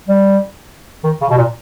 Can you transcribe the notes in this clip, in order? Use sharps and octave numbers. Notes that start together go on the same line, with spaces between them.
G3
D#3
C#3
B2
A#2